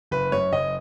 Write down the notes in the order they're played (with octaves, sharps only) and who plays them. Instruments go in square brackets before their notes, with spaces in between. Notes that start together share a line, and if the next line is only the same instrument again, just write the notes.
[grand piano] F#1 B4
F#2 C#5
F#1 D#5